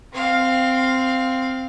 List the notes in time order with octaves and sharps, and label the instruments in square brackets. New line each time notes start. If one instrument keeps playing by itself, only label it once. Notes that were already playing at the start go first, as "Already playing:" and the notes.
[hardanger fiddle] C4 F5